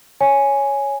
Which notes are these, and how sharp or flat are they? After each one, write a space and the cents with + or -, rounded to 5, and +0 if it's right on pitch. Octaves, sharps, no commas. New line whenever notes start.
C#5 +0 G#5 +0